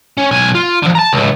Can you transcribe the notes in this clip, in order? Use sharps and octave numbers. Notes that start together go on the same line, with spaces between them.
C#4
B1 G#5
F4
D3 F3
A5 A#5
C#2 A2